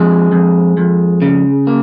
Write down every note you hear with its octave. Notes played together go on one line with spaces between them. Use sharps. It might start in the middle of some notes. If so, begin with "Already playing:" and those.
Already playing: F2 G#3
F2
F2
C#3
A#3